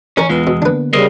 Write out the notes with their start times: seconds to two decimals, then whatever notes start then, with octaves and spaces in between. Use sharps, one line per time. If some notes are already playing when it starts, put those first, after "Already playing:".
0.17 A1 C#4 A#4 A#5
0.30 E2 G#3 F4 B4
0.47 B2 D#6 E6
0.62 D3 A#3 B3 D4 B4
0.93 C#3 G3 A#4 C5 D#5